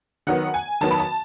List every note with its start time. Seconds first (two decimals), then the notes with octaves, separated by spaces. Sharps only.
0.27 D#3 F#3 B3 F#5
0.54 G#5
0.81 D#3 F#3 B3 A5
0.91 B5
1.00 A5